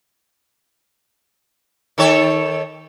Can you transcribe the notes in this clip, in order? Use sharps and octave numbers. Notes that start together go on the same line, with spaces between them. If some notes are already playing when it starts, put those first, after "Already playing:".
D#3 A4 C#5